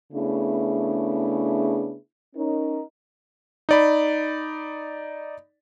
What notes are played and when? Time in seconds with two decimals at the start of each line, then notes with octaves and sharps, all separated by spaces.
0.13 C#3 A3 B3 D4 E4 G#4
2.36 C#4 D#4 A#4
3.69 D#4 D5 B5